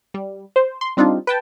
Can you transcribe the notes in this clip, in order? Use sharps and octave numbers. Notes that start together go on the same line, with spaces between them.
G3
C5
C6
G3 C4 D4 D#4 F4
B4 G5 A5